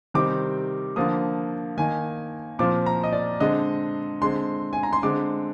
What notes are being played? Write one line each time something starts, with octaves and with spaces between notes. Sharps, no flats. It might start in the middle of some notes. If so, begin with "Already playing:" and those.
C3 D#3 G3 C4 D6
D3 F3 A#3 D#6
D#3 A#3 G#5
A#2 F3 C4 D6
A#5
D#5
D5
D3 G#3 C4 D#5
D3 G#3 C4 C6
G#5
A#5
C6
D3 G#3 C4 D6